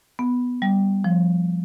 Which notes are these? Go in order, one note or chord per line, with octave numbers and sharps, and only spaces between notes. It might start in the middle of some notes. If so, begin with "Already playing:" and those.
B3
G3
F3